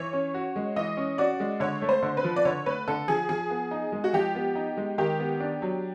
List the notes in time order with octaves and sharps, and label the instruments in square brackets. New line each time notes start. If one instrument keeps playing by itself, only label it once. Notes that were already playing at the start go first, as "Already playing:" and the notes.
Already playing: [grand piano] E3 [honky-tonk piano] C#5
[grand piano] C#4
F#4
G#3
[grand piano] E3 [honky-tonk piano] D#5
[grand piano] C#4
[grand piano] F#4 [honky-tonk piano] D5
[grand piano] G#3
[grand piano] D3 [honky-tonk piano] C#5
[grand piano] A3
[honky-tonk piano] C5
[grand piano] D3
[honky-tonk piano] B4
[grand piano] F3
[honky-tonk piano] D5
[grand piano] D3 [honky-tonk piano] C#5
[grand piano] A3 [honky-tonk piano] B4
[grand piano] D3 [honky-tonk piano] A4
[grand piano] F3 [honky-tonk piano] G#4
[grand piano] F3 [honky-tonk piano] G#4
[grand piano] B3
D#4
G#3
[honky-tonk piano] F#4
[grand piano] F3 [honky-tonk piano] G4
[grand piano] B3
D#4
G#3
[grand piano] D#3 [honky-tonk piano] G4
[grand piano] B3
D4
F#3